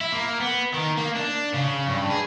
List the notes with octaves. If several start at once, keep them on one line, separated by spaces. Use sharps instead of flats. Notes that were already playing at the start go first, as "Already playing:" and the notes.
E4
A#3
B3
D#3
A#3
D4
C#3
G2
G#4